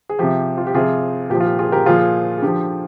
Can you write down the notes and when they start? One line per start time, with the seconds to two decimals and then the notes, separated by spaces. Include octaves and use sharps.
0.09 G#4
0.19 C3 F3 G4
0.58 F4
0.67 G4
0.74 C3 F3 F4 G#4
1.30 A#2 G4
1.34 F3
1.40 F4
1.45 G4
1.59 F4 G#4
1.72 G4 A#4
1.86 A#2 F3 F4 G#4
2.38 G#4
2.42 D3 F3 G4